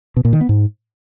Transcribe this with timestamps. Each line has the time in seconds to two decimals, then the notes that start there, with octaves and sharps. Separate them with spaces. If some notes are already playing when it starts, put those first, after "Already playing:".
0.17 B2
0.25 A#2
0.33 D#3
0.41 B3
0.49 G#2